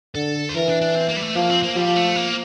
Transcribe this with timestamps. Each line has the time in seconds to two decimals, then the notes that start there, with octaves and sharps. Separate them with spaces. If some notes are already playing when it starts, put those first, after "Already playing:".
0.15 D3 A4
0.49 C5
0.55 E3 A#4
0.68 D4
0.81 D4
0.95 C4
1.09 A#3
1.17 G3
1.22 A3
1.35 F3 A#3
1.49 C4
1.62 A#3
1.76 F3 G3
1.96 A3
2.16 A#3